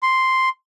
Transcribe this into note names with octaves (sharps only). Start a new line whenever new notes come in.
C6